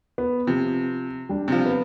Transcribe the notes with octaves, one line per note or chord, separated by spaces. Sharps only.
B3
C3 F3
G3 D4
C3 F3
B3